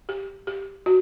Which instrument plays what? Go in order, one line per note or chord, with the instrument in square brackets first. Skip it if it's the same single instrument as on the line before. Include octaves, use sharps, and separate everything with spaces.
[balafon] G4
G4
F#4